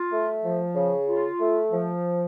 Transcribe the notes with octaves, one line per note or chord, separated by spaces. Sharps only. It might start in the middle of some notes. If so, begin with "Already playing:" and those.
Already playing: F4
A3
F3
C#3
F4
A3
F3